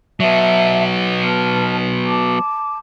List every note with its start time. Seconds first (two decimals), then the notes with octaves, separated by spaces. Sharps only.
0.20 F#3 B3 E5 A5
1.23 B4 A5 F6
2.05 A5 D6